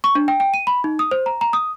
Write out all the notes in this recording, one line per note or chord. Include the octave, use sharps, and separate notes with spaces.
C#6
D4
G5
G5
D#7
B5
D#4
D#6
C5
A#5
A#5
D#6